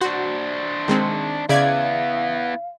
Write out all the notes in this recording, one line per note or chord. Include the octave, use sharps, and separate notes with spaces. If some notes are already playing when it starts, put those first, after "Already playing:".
D4 F#4 C5
D#3 G#3 C4
C#3 B3 E4 D5 F5 G#6